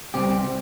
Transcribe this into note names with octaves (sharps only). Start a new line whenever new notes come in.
C2 C3 G3 C4 G4